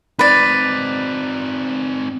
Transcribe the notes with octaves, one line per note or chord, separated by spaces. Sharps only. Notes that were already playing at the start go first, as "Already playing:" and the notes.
C4 D#4 B4 D5